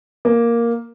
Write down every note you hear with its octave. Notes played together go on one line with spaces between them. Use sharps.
A#3